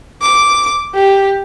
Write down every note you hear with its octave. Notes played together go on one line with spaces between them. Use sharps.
D6
G4